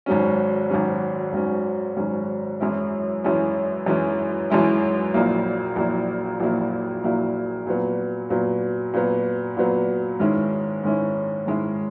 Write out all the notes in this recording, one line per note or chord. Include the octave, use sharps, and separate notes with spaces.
G#1 G#2 F#3 C#4
G#1 G#2 F#3 C#4
G#1 G#2 F#3 C#4
G#1 G#2 F#3 C#4
F#2 E3 G#3 C#4 E4
F#2 E3 G#3 C#4 E4
F#2 E3 G#3 C#4 E4
F#2 E3 G#3 C#4 E4
A#1 A#2 F#3 A#3 E4
A#1 A#2 F#3 A#3 E4
A#1 A#2 F#3 A#3 E4
A#1 A#2 F#3 A#3 E4
A#2 F#3 B3
A#2 F#3 B3
A#2 F#3 B3
A#2 F#3 B3
G#2 D#3 G#3 C#4 E4
G#2 D#3 G#3 C#4 E4
G#2 D#3 G#3 C#4 E4